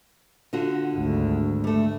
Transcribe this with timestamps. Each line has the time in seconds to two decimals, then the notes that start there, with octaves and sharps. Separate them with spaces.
0.53 D3 F4 F#4
0.95 G#1 D2
1.64 G3 A3